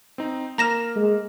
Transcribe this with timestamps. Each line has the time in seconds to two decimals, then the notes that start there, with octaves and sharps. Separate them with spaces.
0.18 C4 D#4
0.58 A#3 A#5 F6 A#6 E7
0.96 G#3